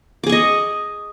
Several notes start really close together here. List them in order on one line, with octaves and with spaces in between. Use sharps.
D6 G#4 C#6 D#5